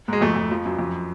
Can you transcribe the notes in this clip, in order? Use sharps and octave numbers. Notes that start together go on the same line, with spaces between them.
G#2 G#3
F2 A3
F2
F3
F#2
F2